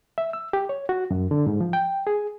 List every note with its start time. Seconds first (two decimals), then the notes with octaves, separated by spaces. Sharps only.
0.18 E5
0.33 E6
0.53 G4
0.69 C#5
0.89 F#4
1.11 F#2
1.31 D3
1.46 G#2
1.61 F3
1.73 G5
2.07 G#4